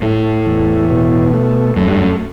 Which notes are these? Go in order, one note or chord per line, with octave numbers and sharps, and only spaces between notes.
A2 A3
E2
B2
A3
F#2 A3
G2
F#2